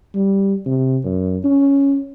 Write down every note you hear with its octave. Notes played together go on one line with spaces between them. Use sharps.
G3
C3
F#2
C#4